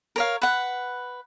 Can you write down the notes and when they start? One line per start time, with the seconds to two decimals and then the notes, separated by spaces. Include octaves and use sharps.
0.16 A#4 C#5 F5
0.42 B4 F#5